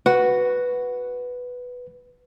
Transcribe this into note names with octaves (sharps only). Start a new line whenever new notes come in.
F#4 B4